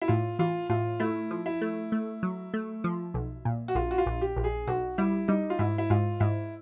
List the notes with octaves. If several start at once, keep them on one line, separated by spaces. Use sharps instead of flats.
E4
A2 F4
E3 F4
A2 F4
A3 E4
F3
E4
A3
A3
F#3
A3
F3
B1
A#2
F#4
A#1 F4
F#4
F4
A#1
G4
A#1
G#4
B1 F#4
G3 E4
G3 D#4
F4
G#2 E4
E4
G#2 F4
G#2 E4